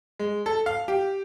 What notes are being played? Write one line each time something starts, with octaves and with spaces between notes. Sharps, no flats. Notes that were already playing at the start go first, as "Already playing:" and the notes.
G#3
A4
F5
G4